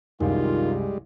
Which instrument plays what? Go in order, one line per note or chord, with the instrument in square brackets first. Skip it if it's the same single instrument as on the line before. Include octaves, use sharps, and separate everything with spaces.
[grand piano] C2 F#2 [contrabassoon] D#3 [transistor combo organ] G3 G#3 [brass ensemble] F4